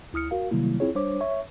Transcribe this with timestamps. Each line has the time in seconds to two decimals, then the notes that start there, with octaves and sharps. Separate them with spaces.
0.13 D2 E4 D#6 F6 C#7
0.31 F#4 A#4 F5
0.51 C3 D#3 F#3 G3 A#3 E4
0.80 C4 E4 F4 G#4 C#5
0.95 G3 D4 C5 C#5 D6
1.20 C#5 E5 C#6